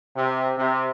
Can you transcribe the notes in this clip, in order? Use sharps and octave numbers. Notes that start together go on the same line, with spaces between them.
C3
C3